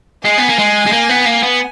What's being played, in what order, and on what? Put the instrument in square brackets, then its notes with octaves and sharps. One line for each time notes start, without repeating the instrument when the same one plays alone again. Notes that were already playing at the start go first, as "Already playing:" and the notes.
[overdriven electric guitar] G#3 [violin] G#5
[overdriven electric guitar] B3
A#3
G#3
G#3
A#3
B3
A#3
B3